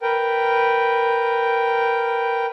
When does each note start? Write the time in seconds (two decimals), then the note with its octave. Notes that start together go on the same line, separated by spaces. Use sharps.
0.02 A#4 B4 G5